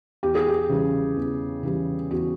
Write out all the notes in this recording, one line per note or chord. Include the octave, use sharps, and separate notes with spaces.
E2 G4
G#4
G4
C#3 E3 G3
E2
C#3 E3 G3
E2 F#4